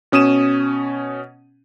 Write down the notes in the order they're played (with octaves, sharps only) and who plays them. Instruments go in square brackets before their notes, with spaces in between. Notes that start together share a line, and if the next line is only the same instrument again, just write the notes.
[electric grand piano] B2 C#4 D#6 D#7 E7